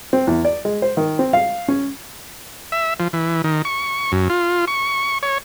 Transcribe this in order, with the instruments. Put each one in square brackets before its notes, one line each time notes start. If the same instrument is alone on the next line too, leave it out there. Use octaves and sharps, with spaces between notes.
[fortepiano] C4
E2
D5
G#3
C5
D#3
C4
F5
C#4
[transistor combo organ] E5
F3
E3
D#3
C#6
F#2
F4
C#6
C#5